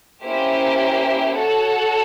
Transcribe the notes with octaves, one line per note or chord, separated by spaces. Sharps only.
A#3 C#4 E4 G4 C5
F#4 A4 C#5 F#5 A5